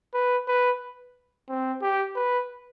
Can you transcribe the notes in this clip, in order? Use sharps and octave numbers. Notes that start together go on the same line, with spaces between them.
B4
B4
C4
G4
B4